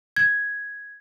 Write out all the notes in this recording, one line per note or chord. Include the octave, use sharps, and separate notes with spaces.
G#6